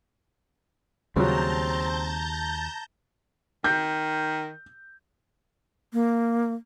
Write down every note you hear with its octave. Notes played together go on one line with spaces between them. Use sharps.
D#2 C#3 F#3 G3 C4 A5 A#5 G6
D#3 G6
A#3